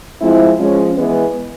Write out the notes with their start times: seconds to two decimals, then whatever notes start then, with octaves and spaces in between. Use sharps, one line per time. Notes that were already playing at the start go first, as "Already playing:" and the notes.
0.21 F3 G#3 C4 E4
0.59 F3 G#3 C#4
0.96 E3 G#3 B3